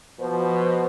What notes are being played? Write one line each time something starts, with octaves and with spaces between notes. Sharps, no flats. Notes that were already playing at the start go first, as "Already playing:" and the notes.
B2 F3 C5